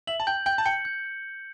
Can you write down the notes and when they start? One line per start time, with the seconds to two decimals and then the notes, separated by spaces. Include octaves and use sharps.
0.07 E5 F#7
0.20 A5
0.27 G5 G6
0.46 G5 G6
0.58 A5
0.66 G5 C#7
0.85 G6